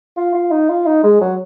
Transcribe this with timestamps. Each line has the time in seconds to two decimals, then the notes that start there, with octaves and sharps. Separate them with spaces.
0.17 F4
0.34 F4
0.51 D#4
0.69 F4
0.87 D#4
1.04 G#3
1.21 F#3